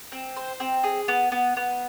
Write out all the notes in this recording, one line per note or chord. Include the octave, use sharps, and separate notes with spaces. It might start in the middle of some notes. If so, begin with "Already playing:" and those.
C4
C5
C4
G#4
B3
B3
B3